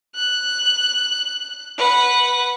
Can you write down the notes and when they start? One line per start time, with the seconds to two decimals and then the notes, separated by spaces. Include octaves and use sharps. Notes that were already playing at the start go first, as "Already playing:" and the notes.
0.16 F#6
1.77 B4 F#5